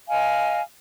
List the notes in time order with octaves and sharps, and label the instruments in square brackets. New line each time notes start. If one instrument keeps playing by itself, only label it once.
[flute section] D#5 F5 G#5